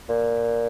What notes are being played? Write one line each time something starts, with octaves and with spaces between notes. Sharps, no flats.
A#2